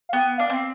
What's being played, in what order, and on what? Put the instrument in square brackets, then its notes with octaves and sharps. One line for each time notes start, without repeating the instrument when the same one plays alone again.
[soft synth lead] F5
[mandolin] B3 [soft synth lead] G5
[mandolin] D4 [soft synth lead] F5
[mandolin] C4